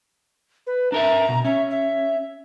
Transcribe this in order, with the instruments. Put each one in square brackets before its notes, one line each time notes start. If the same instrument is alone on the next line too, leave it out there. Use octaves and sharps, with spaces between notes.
[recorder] B4
[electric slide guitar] D4 A#4 E5 [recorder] A#5
[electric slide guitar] B2
[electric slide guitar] C#4 [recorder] E5
[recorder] E5